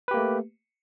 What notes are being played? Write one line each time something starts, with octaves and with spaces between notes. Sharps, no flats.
A3 A#3 G4 B4